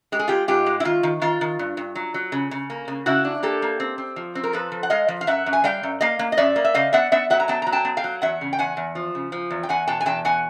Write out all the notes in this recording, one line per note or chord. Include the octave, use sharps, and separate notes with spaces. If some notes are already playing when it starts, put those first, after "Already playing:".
G#3 G4
G#4
G#3 F4 G4
G#2 F4 G4
G#3
E4
D#3 F4
D#3
D#3 F4
D#3
G2
G2
F#3
F#3
C#3
C#3
A#3
C#3
C#3 E4 F#4
D4
A#3 G4 A4
A#3
C4
C4
F3
C4
A#4
F3 A4 B4
F3
F#5
G#3 D#5 F5
F3
F5
F#2 E5 F#5
F#2
G#5
G3 F5 G5
F#2
A#3 D#5 F5
A#3
D#5
F#2 D5 E5
A#3
E5
C#3 D#5 F5
B3 E5 F#5
B3 E5 F#5
F#3 E5 F#5
A#5
B3 G5 A5
F#3 A#5
G5 A5
B3
F5 G5
F#3
E2 E5 F#5
C#3
G5
E2 F#5 G#5
E2
F3
C#3
F3
E2
G5
E2 F#5 G#5
B2 G5 A5
G#5
E2 G5 A5
B2 F#5 G#5